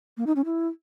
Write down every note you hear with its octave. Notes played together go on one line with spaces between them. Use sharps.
A#3
D#4
C#4
E4